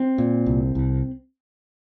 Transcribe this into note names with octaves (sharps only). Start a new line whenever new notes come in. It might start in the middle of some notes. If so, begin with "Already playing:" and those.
Already playing: C4
A#2
C2
C2